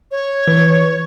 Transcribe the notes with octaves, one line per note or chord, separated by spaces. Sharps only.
C#5
E3 B4